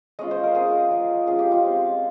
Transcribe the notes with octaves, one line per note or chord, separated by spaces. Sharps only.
G#3 C#4 F4 D#5
C5
A#4
G#3 C#4 F4 G#4
F3 G#3 C#4 F4
F3 G#3 C#4 F4 G#4
G4
F4
G#3 C4 F4